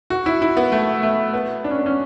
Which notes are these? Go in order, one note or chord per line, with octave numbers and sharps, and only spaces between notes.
F#4
E4
E4
B3
A3
A3
B3
D4
C#4
B3
C#4